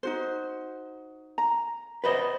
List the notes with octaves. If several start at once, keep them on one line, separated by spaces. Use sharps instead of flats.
D#4 F#4 C5
A#5
B4 C5 D#5